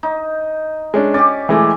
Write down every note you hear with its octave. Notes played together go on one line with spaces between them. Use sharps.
D#4
G#3 C#4 D4
C#4 G4 D5
E3 G#3 A3